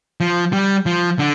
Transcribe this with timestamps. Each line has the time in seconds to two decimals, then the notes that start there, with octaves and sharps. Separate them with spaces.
0.20 F3
0.53 G3
0.86 F3
1.19 D3